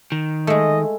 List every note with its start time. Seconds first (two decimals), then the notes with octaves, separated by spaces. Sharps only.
0.12 D#3
0.47 G#3 A3 D#5